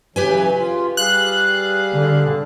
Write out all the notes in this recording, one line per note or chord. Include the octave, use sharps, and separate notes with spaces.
C#3 E3 F#3 G4 B4 G#5
F4
G3 G#4 F5 F#6
D3